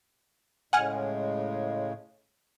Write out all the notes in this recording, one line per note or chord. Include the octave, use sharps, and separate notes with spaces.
A2 C#3 G#3 F#5 G#5 F6